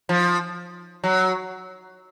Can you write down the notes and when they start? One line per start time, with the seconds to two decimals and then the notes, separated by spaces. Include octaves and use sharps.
0.09 F3
1.04 F#3